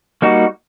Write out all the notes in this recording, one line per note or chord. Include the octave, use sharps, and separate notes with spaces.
G3 A#3 D#4 F#4